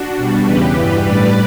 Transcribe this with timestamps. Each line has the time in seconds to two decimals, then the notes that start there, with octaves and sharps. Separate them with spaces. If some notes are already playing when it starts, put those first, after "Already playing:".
Already playing: D4 F#4
0.17 B2 G3
0.46 E2 C#3 E3 G4 B4
0.76 G2 E3 G3
1.05 A2 G3 B4 D5